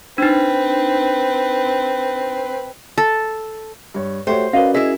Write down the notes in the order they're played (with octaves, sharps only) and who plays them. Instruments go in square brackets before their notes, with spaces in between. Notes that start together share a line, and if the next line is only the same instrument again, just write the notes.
[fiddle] C4 B4 [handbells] D4 D#4
[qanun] A4
[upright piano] G2 C#5
[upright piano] A3 F#4 [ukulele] G4 C#5 [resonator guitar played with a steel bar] C5
[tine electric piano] C#4 F#4 A#4 [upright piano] B4 D5 D#5 [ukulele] F5
[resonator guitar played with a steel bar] E4 G#4 [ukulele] D#5 [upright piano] E6 B6